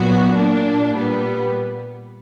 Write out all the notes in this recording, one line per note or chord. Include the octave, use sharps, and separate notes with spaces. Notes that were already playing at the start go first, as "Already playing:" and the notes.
Already playing: A#2 F#3 B3 F#4
A#2 A#3 D4
A#2 G3 B3